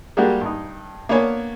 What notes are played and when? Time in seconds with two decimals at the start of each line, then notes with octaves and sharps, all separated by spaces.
0.17 G3 G#3 A#3 D4 F#4 G4
0.41 G2 D#4
1.09 A#3 B3 D4 C#5 G#5